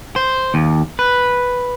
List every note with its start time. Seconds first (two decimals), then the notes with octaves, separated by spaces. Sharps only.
0.16 C5
0.54 D#2
0.99 B4